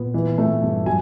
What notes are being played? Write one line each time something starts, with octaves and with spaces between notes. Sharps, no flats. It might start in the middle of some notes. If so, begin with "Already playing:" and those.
Already playing: A#2 B3
E3
A3
G2
F#3 G#5